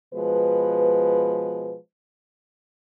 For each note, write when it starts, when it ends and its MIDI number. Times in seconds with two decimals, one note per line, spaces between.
0.14 1.75 47
0.14 1.75 53
0.14 1.75 56
0.14 1.75 71